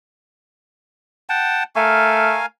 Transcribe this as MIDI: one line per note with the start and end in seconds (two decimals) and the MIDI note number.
1.29 1.63 78
1.29 1.63 79
1.29 1.63 81
1.76 2.42 57
1.76 2.46 70
1.76 2.46 77
1.76 2.46 80